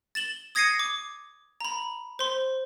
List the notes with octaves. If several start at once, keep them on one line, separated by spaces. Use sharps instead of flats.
A6 E7 F#7 G7
D#6 G#6 A#6 C7 C#7 D#7
D6
A#5 B5
C5 C6